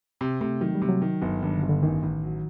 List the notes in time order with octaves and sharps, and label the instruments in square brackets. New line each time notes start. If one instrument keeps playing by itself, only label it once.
[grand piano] C3 [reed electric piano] C4
[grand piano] C3 [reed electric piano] A3
[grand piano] D#3 [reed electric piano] F#3
[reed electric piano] G3
[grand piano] C3
[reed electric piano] F#3
[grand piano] D#3
G1
[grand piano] G2 [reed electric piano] D#3
[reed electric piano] D3
[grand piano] G1
[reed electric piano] D3
[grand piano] A1 [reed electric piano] D#3
[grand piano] A1
F#3